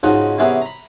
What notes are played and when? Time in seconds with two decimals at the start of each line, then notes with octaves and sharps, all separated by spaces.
0.03 G#2 C#3 F3 C#4 D#4 F#4
0.38 C3 E3 B3 C#4 G#4 A#4
0.62 A#5 B5